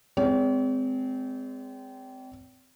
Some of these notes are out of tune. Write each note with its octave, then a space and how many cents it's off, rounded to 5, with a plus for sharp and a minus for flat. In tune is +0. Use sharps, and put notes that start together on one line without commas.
G#3 +0 C4 -25 C#5 +45